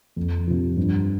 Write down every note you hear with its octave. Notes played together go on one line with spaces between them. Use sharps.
F2
C3 F3
G2